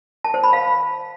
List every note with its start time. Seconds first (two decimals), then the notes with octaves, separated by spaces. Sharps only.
0.24 A5
0.34 C5
0.43 B5
0.53 F5